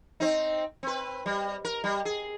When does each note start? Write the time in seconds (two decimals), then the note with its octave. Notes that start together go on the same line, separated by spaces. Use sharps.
0.20 C4 D#4
0.83 C4 B4
1.26 G3
1.65 A#4
1.84 G3
2.05 G#4